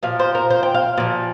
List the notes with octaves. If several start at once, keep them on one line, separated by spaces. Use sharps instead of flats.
A#2 F3 F5
C5
A#4
C5
G5
F5
A#2 F3